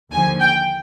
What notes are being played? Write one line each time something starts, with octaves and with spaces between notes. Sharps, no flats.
D#2 D3 F3 G#5
G5